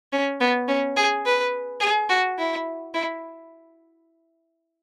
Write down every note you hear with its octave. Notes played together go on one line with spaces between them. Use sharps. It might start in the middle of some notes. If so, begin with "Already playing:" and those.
C#4
B3
C#4
G#4
B4
G#4
F#4
E4
E4